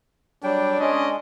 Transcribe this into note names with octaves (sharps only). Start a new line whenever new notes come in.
F#3 G3 D4 G5
G#3 C#4 D#5